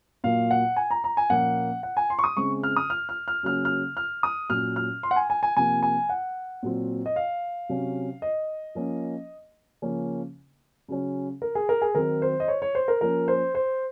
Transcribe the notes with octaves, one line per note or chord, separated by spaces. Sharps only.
A#2 F#3 A#3 F5
F#5
G#5
A#5
A#5
G#5
A#2 F3 A#3 C#4 F#5
F#5
G#5
C6
C#6
D#6
C#3 G#3 C4 C#6
F6
D#6
F6
F6
F6
C#3 F#3 A#3 C#4 F6
F6
F6
D#6
A#2 F#3 C#4 F6
F6
C6
F#5
G#5
G#5
G#5
C3 F3 A#3 G#5
G#5
F#5
A#2 F#3 C4
D#5
F5
C3 F#3 C#4
D#5
F3 A#3 C#4
C#3 F3 A#3 C#4
C#3 F#3 C#4
A#4
G#4
A#4
G#4
D#3 F#3 C4 A#4
C5
D#5
C#5
C#5
C5
A#4
F3 A#3 C#4 A#4
C5
C5